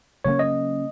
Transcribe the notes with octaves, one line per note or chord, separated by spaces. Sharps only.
C#3 F#3 A#3 C#4 C#5
D#5